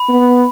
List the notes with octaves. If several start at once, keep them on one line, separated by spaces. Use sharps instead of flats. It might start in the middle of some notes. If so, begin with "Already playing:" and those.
Already playing: B5
B3